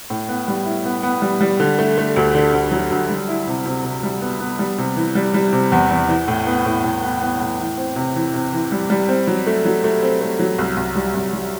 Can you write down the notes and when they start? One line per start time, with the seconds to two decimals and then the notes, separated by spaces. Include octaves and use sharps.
0.10 A2
0.29 B3
0.48 G3
0.66 E4
0.85 B3
1.03 B3
1.22 G3
1.41 G3
1.60 D3
1.79 A3
1.98 A3
2.16 D2
2.35 D3
2.53 D2
2.71 F#3
2.91 D2
3.10 G3
3.28 E4
3.47 C3
3.66 C3
3.84 C3
4.03 G3
4.21 B3
4.40 B3
4.59 G3
4.78 C3
4.96 E3
5.15 G3
5.34 G3
5.53 C3
5.72 E2
5.90 E2
6.09 E3
6.28 A2
6.47 B3
6.65 A2
6.84 A2
7.03 B3
7.21 B3
7.40 A2
7.59 E3
7.78 C4
7.96 C3
8.16 E3
8.34 C3
8.53 E3
8.72 G3
8.90 G3
9.09 C4
9.27 F#3
9.47 A3
9.65 F#3
9.84 A3
10.03 C4
10.21 A3
10.39 F#3
10.59 C2
10.77 C2
10.95 G3
11.15 C2
11.33 G3